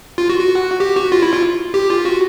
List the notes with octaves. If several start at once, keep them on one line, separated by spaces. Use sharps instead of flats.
F4
F#4
F#4
G4
F#4
F4
E4
F4
G4
F4
F#4